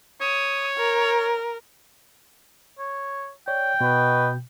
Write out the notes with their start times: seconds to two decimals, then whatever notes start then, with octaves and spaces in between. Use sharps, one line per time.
0.21 C#5 D#6
0.77 A#4
2.79 C#5
3.48 C#5 D5 G5
3.81 B2 F#4 B4 D#5